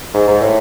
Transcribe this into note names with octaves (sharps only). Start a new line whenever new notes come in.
G#2
G#2
A2